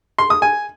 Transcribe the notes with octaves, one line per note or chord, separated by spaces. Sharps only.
C6
D#6
G#5